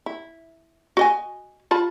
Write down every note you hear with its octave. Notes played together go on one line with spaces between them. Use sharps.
E4
F#4 D#5 G#5
F4 A5 B5